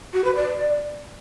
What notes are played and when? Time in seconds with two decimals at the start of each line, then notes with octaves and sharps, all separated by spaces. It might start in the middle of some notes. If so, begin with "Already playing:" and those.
0.13 F#4
0.24 B4
0.35 D5